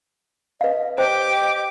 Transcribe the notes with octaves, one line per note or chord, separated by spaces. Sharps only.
B4 D#5 F5
G4 C5 D#5 G5 D6